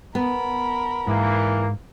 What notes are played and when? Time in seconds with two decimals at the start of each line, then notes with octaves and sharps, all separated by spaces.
0.15 B3 A#4 B5
1.07 G#2 E3 A#3